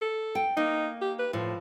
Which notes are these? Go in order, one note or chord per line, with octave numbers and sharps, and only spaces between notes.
A4
G5
A#3 D#4
G4
B4
A2 F3